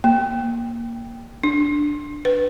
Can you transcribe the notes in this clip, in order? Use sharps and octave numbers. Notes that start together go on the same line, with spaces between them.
A#3
D4
B4